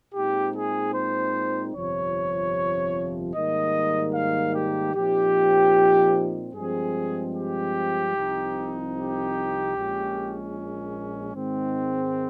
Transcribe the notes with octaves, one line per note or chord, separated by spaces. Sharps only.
A#2 G#3 C4 D#4 G4
G#4
C5
G1 F2 C3 F3 C#5
G#2 D#3 G3 A#3 D#5
F5
G4
A#2 F3 C4 D#4 G4
G2 F3 G#3 C4 G#4
G4
C2 C3 F3 C4 D#4
G4
A#1 A#2 G#3 C#4
G#2 D#3 G#3 C4